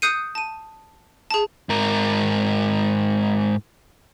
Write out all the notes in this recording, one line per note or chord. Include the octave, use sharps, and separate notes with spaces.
D#6 F#6 G6 C7 C#7 D#7
A5 D#7
G#4 A5
G#2 A#4